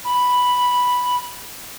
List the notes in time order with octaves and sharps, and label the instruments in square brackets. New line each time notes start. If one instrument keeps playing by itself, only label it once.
[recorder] B5